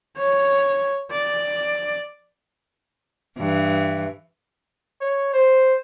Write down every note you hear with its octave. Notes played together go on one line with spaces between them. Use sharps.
C#5
D5
G2 E3
C#5
C5